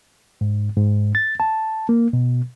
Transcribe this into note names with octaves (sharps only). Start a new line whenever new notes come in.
G#2
G#2
A6
A5
A#3
B2